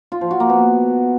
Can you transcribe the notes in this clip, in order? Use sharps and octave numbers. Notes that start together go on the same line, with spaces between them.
F4
F3
F#4
A#3
B3